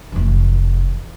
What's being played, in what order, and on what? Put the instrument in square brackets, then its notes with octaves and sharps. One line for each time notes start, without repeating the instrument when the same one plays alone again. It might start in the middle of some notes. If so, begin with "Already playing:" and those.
[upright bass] F1 E3